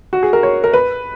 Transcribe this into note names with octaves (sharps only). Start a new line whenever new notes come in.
F#4
G#4
A#4
C#5
A#4
B4